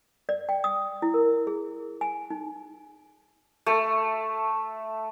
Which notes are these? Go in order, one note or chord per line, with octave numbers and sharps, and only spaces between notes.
D5
G5
D#6
E4
A#4
G#4
G#5
D#4
A3